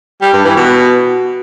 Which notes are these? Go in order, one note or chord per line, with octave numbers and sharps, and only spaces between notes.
G3
G2
E3
B2